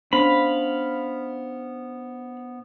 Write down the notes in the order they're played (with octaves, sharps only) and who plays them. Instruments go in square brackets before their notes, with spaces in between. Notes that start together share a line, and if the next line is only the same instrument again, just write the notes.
[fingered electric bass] B3 [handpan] C#4 D4 [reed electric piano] C5 [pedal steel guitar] F5 B5